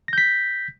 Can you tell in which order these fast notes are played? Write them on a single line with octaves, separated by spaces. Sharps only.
A#6 G6 B6